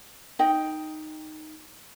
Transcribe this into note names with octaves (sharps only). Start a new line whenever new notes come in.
D#4 D#5 G5